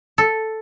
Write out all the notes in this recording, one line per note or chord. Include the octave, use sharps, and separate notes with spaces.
A4